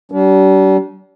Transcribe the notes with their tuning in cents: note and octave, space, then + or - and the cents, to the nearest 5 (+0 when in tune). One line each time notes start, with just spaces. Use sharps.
G3 -40 D4 -40